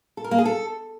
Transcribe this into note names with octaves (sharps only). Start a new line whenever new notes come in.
A4
A#4
A#3
G#4
A4